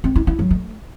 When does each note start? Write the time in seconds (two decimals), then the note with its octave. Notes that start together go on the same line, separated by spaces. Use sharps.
0.04 C4
0.16 E4
0.27 E4
0.39 F#3
0.51 A3